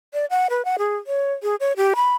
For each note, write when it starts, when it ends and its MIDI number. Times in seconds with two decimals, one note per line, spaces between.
0.14 0.26 74
0.30 0.47 78
0.50 0.64 71
0.65 0.76 78
0.78 0.97 68
1.07 1.33 73
1.43 1.56 68
1.60 1.72 73
1.77 1.94 67
1.96 2.15 83